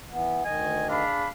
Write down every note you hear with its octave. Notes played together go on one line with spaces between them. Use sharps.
E3 B3
D2 D#3 D#5 G#5
D4 G#4 F5 B5